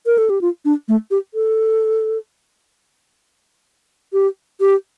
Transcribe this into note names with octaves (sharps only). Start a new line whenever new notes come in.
A#4
A4
G4
F4
D4
A3
G4
A4
G4
G4